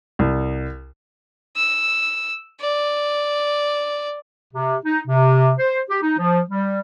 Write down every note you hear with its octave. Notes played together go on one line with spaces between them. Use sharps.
C2
E6
D5
C3
D#4
C3
C5
G4
D#4
F3
G3